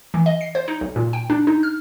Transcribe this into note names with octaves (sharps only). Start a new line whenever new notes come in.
E3
D#5
C7
C5
D#4
B1
A#2
G5
D4
D#4
F6